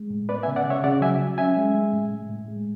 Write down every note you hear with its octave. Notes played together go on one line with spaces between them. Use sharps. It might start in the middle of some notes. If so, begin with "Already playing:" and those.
Already playing: G#3
A2
B3 B4 D5
E5 G#5
C#3
D5 F#5
C#3 C#5 E5
C#3 D5 F#5
F#3 E5 G#5
F#3
C#4 E5 G#5
G#3
G#3
A2
A2
A2
G#3